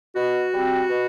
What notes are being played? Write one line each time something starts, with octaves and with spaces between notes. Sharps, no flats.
B2 F#4
G3 C4
B2